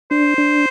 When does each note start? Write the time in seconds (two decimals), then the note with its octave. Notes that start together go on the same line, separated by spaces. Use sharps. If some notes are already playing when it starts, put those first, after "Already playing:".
0.11 D4 C5
0.38 D4